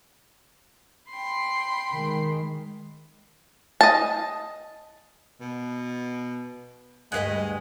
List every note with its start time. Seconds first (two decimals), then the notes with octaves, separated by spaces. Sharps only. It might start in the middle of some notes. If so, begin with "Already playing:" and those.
1.10 G5 B5 C6
1.93 D#3 G#3
3.81 D#5 A5
5.41 B2
7.12 D2 G2 G#3 B4 D#5 F5 F#5